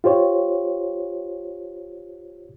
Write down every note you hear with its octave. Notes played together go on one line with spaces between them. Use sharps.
F4 G4 C5 C#5